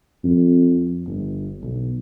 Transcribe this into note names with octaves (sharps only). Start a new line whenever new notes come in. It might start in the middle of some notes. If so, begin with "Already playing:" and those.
F2
G1
B1